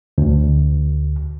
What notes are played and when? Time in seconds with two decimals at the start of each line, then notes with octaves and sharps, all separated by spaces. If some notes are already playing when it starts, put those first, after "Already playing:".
0.18 D2